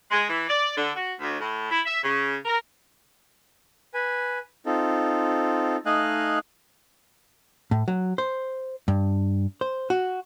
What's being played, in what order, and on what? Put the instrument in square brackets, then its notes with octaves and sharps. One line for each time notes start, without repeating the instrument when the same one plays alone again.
[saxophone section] G#3
E3
D5
D3
F#4
D2
A2
E4
E5
C#3
A#4
[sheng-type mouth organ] B4 G#5
C4 D#4 F4 A4
A3 D#4 D#5 F5 G#5 F#6
[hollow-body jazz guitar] A2
F#3
C5
G2
C5
F#4